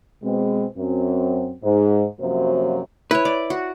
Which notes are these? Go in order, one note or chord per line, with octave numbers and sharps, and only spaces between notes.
B2 G#3 C4
F#2 C4
G#2
F#2 C3 F3 F#3 A#3 C5
E4 B4 C#5
D5
F#4